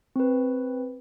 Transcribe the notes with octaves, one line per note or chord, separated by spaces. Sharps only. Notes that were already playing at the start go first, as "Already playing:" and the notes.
C4 B4